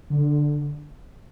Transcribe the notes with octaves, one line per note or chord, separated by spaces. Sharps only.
D3